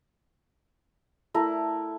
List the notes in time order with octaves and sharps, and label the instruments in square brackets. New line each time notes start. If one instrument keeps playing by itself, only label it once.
[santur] A3 E4 A#4